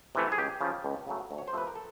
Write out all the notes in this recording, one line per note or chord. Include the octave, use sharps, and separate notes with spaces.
C3 E3 A3
G#4
C#2 G4
C#3 F3
C#2
C#3 F#3 A3
D2
C#5
C5
C3 F3 A3 B4
A#4
A4